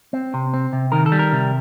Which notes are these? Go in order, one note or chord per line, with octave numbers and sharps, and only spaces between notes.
C4
C3
C4
C3
D#3 A#4
A4
G3
A#4
C3